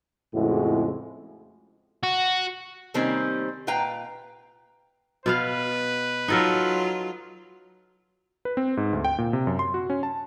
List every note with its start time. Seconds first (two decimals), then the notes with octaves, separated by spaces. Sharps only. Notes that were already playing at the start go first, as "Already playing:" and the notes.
0.34 F2 A2 C#3 G#3 E4 F#4
2.03 F#4
2.94 C3 D#3 G3 A#3 C4 C#4
3.67 A#2 B4 F5 G5 A#5
5.26 B2 B3 B4 F5
6.28 F#3 D#4 F4 A4 A#4
8.45 B4
8.57 C4
8.77 G#2
8.93 D2
9.05 G5
9.18 A#2
9.33 C3
9.47 F#2
9.59 C6
9.74 F#4
9.90 C#4
10.03 A5